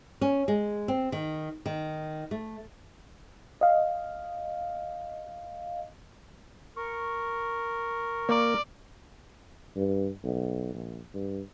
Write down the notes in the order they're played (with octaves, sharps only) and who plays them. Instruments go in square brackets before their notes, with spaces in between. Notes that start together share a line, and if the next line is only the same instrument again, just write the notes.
[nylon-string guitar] C#4
G#3
C4
D#3
D#3
A3
[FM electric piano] D#5 F5
[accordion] A#4 [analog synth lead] C#6
[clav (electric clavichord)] A#3 [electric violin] D5
[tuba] G2
B1
A#1
G2